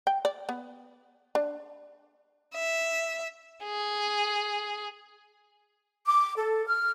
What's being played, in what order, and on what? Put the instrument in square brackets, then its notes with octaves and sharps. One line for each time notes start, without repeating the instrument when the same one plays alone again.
[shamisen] G5
D5
B3
D4
[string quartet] E5
[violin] G#4
[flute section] D6
A4
F6